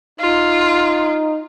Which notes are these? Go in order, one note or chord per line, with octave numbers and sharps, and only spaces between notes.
D#4 F4